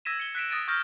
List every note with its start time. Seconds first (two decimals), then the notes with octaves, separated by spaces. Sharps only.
0.05 E6 G#6 A#6 B6 D#7 E7
0.20 C#7 G7
0.35 F#6 B6 D7 E7
0.49 D#6 A6 A#6 D7 D#7
0.68 C#6 D#6 F6 G6 A#6